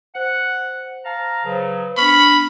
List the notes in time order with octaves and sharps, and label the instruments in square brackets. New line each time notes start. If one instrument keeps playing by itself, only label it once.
[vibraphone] C5 [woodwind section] F#5
[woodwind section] F5 A5 A#5
[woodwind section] C#3 F#3 [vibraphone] B4 C5
[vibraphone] B3 D4 [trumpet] B5 [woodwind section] C#6 F6